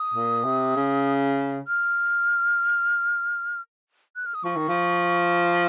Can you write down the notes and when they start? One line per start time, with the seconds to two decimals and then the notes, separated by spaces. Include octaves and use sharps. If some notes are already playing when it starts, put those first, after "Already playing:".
Already playing: D#6
0.14 A#2
0.45 C3
0.76 C#3
1.68 F6
4.16 F#6
4.26 F6
4.35 D#6
4.44 F3 C#6
4.56 D#3
4.69 F3